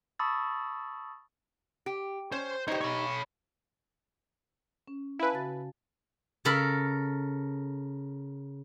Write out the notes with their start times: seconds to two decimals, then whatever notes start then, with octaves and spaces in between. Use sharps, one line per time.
0.19 A5 B5 C#6 D#6 E6 A6
1.86 G4
2.32 C#4 C5
2.68 D#4 G4 C5 C#5
2.81 C#5 B5
4.88 C#4
5.19 E4 B4 F5 G#5 A5
5.33 C#3 F#4 A6
6.45 C#3 A4 A#4 B5